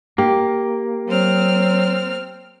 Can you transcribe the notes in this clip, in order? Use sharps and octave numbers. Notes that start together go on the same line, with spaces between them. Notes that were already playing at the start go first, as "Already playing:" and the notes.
A#3 G4
F#3 C4 F6